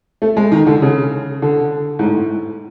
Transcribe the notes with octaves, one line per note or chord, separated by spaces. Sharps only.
A3
G#3
D#3
D3
C#3
D3
G#2
A2